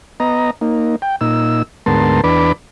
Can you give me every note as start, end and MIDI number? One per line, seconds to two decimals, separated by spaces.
0.20 0.51 59
0.20 0.51 75
0.20 0.51 82
0.61 0.96 58
0.61 0.96 63
1.02 1.16 79
1.21 1.62 46
1.21 1.62 63
1.21 1.62 88
1.86 2.21 38
1.86 2.21 44
1.86 2.21 59
1.86 2.21 70
1.86 2.21 81
1.86 2.21 84
2.24 2.52 40
2.24 2.52 62
2.24 2.52 71
2.24 2.52 83
2.24 2.52 86